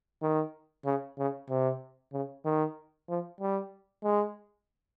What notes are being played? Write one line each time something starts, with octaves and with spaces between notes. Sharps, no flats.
D#3
C#3
C#3
C3
C#3
D#3
F3
G3
G#3